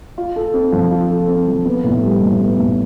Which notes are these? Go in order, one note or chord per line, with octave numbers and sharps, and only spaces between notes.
F4
A4
C4
F3
F4
A4
C4
F3
B3
A2
G3
A2
B3
A2